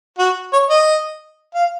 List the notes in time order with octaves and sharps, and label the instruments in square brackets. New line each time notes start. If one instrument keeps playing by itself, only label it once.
[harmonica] F#4
C#5
D#5
F5